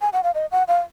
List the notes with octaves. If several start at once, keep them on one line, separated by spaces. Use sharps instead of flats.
G#5
F#5
F5
D#5
F#5
F5